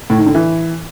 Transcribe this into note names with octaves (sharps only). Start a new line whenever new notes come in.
A2
D#3
D3
E3